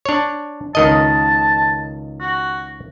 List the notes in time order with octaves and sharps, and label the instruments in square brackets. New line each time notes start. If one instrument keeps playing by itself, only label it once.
[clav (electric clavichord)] D4 C#5
[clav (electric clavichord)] C#2 D#3 D#5 [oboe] A5
[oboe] F#4